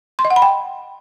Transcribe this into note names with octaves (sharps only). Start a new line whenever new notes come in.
C6
D#5
F#5
B5
G5